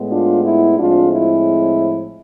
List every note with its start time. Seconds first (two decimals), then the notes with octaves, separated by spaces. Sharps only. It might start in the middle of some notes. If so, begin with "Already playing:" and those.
Already playing: A2 G#3 B3
0.11 D4 F4
0.45 E4
0.78 A2 F3 G#3 C4 D4 F4
1.12 E4